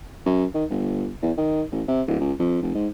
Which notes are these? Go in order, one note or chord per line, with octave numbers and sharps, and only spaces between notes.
F#2
D#3
G1
E2
D#3
A1
C3
D1
C#2
F2
F1
G#2